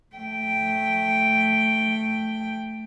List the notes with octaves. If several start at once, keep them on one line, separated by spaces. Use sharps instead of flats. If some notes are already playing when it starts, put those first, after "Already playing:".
A3 G5